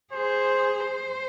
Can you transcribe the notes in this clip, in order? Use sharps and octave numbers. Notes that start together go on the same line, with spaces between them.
G#4 C5
C5